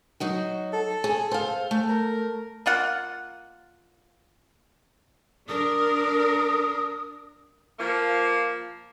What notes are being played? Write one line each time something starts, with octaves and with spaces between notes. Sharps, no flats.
F#3 D#4 F#4
A4
G#4
C5 F5
A3
A#4
A#3 F4 F#5
D4 A#4 D#6
F3 A#3